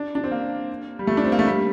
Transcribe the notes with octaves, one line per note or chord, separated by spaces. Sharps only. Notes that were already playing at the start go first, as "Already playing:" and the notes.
Already playing: D4
D4
C4
A#3
G3
A3
D4
C4
A#3
A3
G3